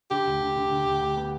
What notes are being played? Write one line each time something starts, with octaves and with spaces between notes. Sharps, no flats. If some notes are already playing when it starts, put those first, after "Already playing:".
D3 G4
D2
D3
D3
D3
D2
D2
B3